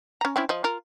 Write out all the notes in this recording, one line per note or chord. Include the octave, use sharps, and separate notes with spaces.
C#4 A#5
C4 C#4 E4
F3 D#5
F4 A#4